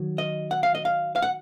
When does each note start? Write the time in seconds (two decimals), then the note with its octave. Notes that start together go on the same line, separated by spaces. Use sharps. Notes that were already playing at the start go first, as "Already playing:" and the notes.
Already playing: D#3 F#3
0.18 D#5
0.51 F#5
0.63 F5
0.75 D#5
0.85 F5
1.16 F5
1.22 F#5